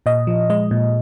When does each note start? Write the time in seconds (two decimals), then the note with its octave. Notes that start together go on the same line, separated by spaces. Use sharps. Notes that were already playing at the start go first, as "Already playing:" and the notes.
0.06 A#2 D#5
0.27 F3
0.50 G#3 D#5
0.71 A#2